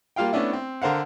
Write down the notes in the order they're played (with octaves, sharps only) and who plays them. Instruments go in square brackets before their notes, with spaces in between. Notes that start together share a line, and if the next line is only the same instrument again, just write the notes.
[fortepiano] G3 A#3 F4 F5 G5
A3 B3 C#4 D4 E4
C4
D3 A#4 C5 F5 F#5